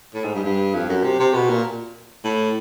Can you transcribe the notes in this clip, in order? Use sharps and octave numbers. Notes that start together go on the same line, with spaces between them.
A2
G#2
G2
G2
F2
F#2
C3
C3
B2
A#2
A2